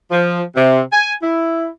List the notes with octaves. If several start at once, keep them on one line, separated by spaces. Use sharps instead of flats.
F3
C3
G#5
E4